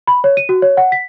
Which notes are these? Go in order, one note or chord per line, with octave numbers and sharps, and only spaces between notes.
B5
C#5
D#7
F#4
C#5
F#5
B6